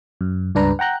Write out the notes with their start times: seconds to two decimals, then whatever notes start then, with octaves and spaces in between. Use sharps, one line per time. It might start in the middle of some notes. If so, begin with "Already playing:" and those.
0.21 F#2
0.55 C#2 G2 D4 B4 A#5
0.79 F#5 G5 A#5 F#6 G6